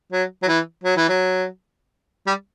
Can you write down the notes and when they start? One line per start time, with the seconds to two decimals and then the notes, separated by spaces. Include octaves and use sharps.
0.12 F#3
0.43 F#3
0.48 E3
0.84 F#3
0.96 E3
1.09 F#3
2.27 G3